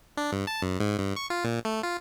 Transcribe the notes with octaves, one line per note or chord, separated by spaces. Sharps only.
D4
G2
A5
F#2
G#2
G2
C#6
F4
A#2
A3
F4